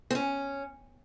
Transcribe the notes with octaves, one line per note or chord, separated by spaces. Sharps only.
C4
C#4